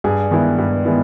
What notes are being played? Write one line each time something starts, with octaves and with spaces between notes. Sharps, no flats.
G2 G#4
D#3 G#3 B3 E4
G2
D#3 G#3 B3 E4